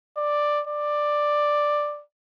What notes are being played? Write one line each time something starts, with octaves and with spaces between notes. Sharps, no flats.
D5
D5